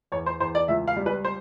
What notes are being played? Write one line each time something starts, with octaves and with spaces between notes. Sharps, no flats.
E2 C#5
C5
E2 C5
D5
C#2 E5
F5
G3
B4
C5